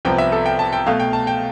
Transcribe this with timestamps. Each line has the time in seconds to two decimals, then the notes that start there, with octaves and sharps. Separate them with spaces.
0.05 C2 C3 F3 B3 G5
0.18 E5
0.32 A4
0.46 G5
0.59 A5
0.73 G5
0.86 B2 A3 F5
1.00 G5
1.13 A5
1.27 G5